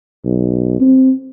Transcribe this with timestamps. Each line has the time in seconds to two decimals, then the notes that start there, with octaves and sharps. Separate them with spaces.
0.25 B1
0.80 C4